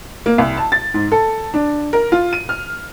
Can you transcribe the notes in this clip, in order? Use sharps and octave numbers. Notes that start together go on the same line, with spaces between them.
A#3
C2
A5
A6
G#2
A4
D4
A#4
F4
D#7
F6